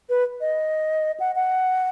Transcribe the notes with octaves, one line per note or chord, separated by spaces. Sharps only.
B4
D#5
F#5
F#5